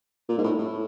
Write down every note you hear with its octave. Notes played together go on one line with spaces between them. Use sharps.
A#2
G#2
A2
A2